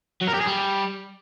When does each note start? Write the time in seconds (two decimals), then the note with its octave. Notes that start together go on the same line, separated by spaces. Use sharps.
0.21 F#3
0.27 A#4
0.34 G4
0.40 G#4
0.46 G3